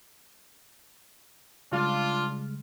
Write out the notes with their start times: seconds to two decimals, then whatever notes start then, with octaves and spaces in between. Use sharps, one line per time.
1.72 C#3 G3 G#3 D4 F4